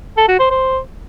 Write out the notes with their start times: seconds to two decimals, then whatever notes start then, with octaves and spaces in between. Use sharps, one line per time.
0.17 A4
0.28 F#4
0.39 C5
0.51 C5